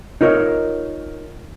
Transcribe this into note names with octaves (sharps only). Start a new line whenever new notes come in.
D#4 F4 A#4 C#5